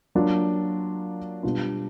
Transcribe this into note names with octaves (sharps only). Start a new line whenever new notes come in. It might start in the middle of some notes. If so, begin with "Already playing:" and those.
F#3 A#3 D4 F4
B2 G3 B3 D4 F4